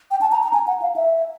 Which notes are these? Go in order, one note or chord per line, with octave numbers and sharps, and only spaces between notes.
G5
A5
A#5
A#5
G#5
F#5
F5
E5